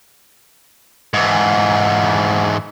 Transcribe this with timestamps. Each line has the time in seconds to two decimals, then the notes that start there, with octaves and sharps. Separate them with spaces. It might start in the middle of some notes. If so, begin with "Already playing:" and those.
1.14 G#2 E3